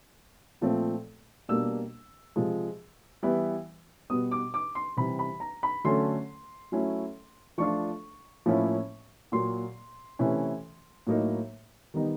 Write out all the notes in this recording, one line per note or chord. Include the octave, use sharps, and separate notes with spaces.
A#2 F3 A3 C4
B2 G3 A#3 D4 E6
C3 F3 G#3
E3 G3 B3 E4
B2 G3 B3 D#6
D6
D6
C6
C3 E3 G3 B5
B5
A#5
B5
D3 F#3 A3 C#4 C6
F#3 A3 C#4 E4
F3 A3 D4 F4 C#6
A2 F3 A#3 C#4 E4
A#2 F#3 A#3 C6
C3 E3 A3 C#4 E4
A2 F#3 A#3 D#4
D#3 G3 B3 D#4